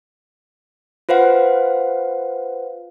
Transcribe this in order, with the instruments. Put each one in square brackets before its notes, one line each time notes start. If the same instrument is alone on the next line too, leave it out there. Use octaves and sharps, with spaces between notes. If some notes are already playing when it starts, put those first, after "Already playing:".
[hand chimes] F4 B4 C5 F5 F#5